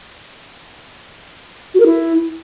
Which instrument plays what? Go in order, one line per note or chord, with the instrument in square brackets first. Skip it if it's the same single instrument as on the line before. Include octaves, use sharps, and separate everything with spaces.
[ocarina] F#4
A#4
E4